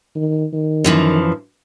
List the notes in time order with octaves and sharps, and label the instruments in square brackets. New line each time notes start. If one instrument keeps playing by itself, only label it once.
[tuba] D#3
D#3
[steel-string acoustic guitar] F#2 E3 F3